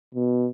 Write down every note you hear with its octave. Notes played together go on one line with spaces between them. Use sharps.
B2